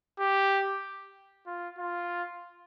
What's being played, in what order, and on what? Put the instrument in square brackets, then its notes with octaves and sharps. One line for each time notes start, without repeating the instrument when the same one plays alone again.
[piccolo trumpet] G4
F4
F4